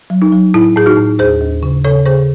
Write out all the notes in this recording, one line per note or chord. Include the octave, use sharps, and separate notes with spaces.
F#3
D#4
F#3
A2 E4
A2 G#4
D#4 F#4
A2
D#2 G#4 C5
D#2
C#3
C#3 A4 C#5
C#3 G#4 C5